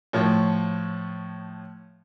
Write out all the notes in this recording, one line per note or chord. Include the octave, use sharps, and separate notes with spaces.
A2 F3 C#5